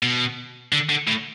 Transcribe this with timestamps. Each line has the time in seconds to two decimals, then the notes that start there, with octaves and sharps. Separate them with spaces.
0.03 B2
0.73 D3
0.89 D3
1.07 A2